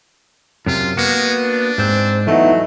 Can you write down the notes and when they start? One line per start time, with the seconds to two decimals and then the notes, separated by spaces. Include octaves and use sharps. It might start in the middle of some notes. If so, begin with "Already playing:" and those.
0.66 F#2 C3 F4
0.97 G#3 A#3 B3 F#4
1.44 D4
1.78 G#2 C4
2.27 E3 F#3 A3 B3 D#4 E4